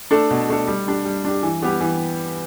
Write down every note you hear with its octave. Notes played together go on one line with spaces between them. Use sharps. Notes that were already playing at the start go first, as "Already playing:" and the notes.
A3 D4 A4
B2
A3 D4 A4
G3
D4 G4
G3
D4 G4
E3
G3 B3 G4
E3